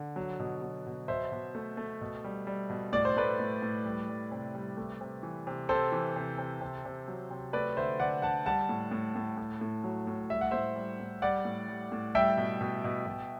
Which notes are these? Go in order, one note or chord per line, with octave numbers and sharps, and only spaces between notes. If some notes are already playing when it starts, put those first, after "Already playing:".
Already playing: D3
F#3
B2
F#3
B2
B2 C5 E5
B2
A3
A3
B2
G3
G3
B2
A2 D5
C5
A3 B4 D5
A2
A2
G3
G3
C3
G3
A3
C3
E3
C3
C3 A4 C5
E3
C3
C3
C3
C3
F#3
C3
A3 B4 D5
D3 C5 E5
D3 D5 F#5
D3 F#5 A5
G3 F#5 A5
A2
A2
A2
A2
A2
F#3
A2
G3 E5
F#5
A2 C5 E5
G3
A2
G3 D5 F#5
A2
G3
A2
G3 E5 G5
B2
B2
B2
B2